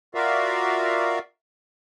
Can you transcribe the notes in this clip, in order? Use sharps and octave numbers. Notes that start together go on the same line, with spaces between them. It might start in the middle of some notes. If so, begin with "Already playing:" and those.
F4 F#4 A#4 D5 E5 F5